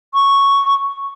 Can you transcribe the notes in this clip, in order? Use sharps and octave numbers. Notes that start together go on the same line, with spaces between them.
C#6